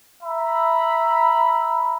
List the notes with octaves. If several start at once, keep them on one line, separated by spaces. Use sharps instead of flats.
E5 A#5 B5